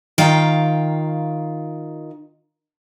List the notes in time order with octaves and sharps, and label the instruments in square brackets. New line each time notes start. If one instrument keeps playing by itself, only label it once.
[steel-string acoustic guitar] D#3 F4 F5 G5 A#5